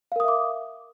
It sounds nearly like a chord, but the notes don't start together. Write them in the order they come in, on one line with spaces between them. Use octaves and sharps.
F5 A#4 D#6 E5 D6